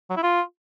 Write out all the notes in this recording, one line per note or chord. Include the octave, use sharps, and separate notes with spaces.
F#3
E4
F4